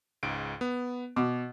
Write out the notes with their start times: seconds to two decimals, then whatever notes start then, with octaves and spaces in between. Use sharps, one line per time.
0.23 C#2 G#2 D7
0.61 B3
1.16 B2 D6